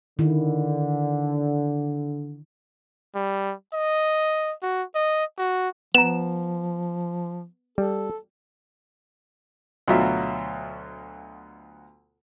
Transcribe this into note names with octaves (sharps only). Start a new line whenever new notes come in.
D3 D#3 E4
G3
D#5
F#4
D#5
F#4
F3 B3 A#5 E7
G3 A4
D2 B2 F#3 F4 E5